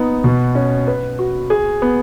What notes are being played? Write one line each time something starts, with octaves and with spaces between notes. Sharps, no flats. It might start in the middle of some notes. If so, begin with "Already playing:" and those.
Already playing: B3 D#4
B2
C#4
B4
F#4
G#4
B3